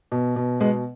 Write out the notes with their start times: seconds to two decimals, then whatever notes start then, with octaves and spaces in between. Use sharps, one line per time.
0.12 B2
0.36 B2
0.60 B2 G#3 B3